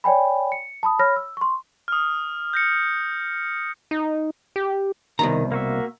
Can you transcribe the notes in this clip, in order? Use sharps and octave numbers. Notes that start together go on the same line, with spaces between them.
C#5 D5 G5 G#5 B5
C#7
A5 B5 D#6
C#5 B5 F6 A#6
E6
C6 C#6
D#6 F6
G6 A#6 C#7
D#4
G4
C2 B2 D#3 A#5
A#3 F#4 E5